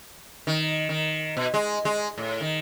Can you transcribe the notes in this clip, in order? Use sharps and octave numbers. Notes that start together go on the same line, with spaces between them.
D#3
D#3
B2
G#3
G#3
A2
D#3